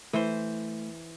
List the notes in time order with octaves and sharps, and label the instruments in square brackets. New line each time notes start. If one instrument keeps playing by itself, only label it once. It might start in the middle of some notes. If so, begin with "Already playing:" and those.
[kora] E3 C5 [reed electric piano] A3